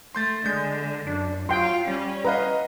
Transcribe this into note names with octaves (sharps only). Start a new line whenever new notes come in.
A3 C6 G6 A6
D3 G#3 G6
F#2 D4
F#3 F4 G5 C6
G3 C#4
B4 D#5 F5 F#5 A#5